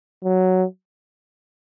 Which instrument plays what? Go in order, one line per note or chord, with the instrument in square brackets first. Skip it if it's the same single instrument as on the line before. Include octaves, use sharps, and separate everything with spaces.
[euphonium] F#3